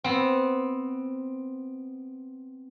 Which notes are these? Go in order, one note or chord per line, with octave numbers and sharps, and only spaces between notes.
B3 C4